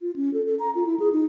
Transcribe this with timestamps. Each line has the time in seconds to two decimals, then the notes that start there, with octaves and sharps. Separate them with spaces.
0.01 F4
0.16 C#4
0.34 A4
0.46 A4
0.60 A#5
0.75 F4
0.87 E4
1.00 G#4
1.13 D#4